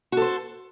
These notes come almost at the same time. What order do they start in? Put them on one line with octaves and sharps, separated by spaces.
F#4 A4 C5